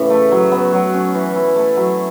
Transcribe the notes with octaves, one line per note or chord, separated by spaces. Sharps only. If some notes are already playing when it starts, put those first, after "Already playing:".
Already playing: A2 C#3 E3
A3
F#3
B3
F#3
C#4
E3
E4
A3
F#3